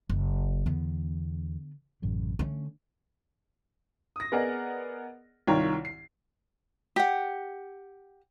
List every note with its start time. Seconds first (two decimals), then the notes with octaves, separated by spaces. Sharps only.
0.09 F#1
0.66 E2 D3 B3
2.02 A1 F#2 C#3
2.39 D3 A3 C#4
4.16 D#6 A#6
4.32 B3 G#4 A#4 D5 D#5 F#5
5.47 C2 D#3 F4 C#5 G5 A#5
5.85 C7
6.96 G4 F#5